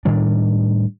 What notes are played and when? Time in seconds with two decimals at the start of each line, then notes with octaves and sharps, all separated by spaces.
0.05 A2 D#3 G3 D4